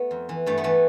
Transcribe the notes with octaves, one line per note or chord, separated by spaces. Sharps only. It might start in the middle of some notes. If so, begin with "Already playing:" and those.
Already playing: A3 B3
F2
E3
G2 A3
B3
E3 A3